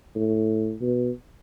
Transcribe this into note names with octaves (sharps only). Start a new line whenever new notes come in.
A2
B2